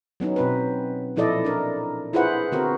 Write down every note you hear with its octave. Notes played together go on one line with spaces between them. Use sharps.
F#3 B3 C#4 D#4
B2 C4 B4
A#2 F3 E4 A4 D5 D#5
D4 A#4
E4 F4 G#4 B4 C5 F#5
D3 B3 C4 F#4 A#4 C5